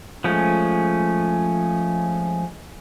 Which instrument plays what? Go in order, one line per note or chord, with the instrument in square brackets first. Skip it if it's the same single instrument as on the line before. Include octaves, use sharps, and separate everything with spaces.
[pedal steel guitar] F3 G#3 A3 C#4